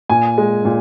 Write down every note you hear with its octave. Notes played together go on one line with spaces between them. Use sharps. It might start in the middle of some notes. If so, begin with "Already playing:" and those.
A#2 G#5
G#3
A#2